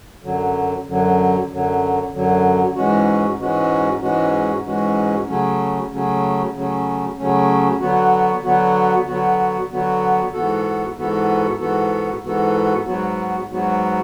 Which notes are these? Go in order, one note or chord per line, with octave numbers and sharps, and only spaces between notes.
F#2 D3 F#3
F#2 D3 F#3
F#2 D3 F#3
F#2 D3 F#3
G#2 E3 G#3 C#4 F#4
G#2 E3 G#3 C#4 F#4
G#2 E3 G#3 C#4 F#4
G#2 E3 G#3 C#4 F#4
C#3 F#3 A3 C#4
C#3 F#3 A3 C#4
C#3 F#3 A3 C#4
C#3 F#3 A3 C#4
D3 F#3 B3 F#4
D3 F#3 B3 F#4
D3 F#3 B3 F#4
D3 F#3 B3 F#4
G#2 E3 B3 F#4 A4
G#2 E3 B3 F#4 A4
G#2 E3 B3 F#4 A4
G#2 E3 B3 F#4 A4
G#2 F#3 B3 F#4
G#2 F#3 B3 F#4